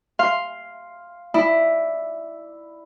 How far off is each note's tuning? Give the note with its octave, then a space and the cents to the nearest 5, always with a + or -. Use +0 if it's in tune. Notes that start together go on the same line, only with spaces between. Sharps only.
F5 +0 C6 +5
E4 +0 D5 +10